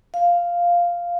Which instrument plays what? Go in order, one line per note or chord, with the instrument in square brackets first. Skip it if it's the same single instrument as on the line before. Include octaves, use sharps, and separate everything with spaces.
[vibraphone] F5